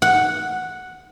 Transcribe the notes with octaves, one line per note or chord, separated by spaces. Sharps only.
F#5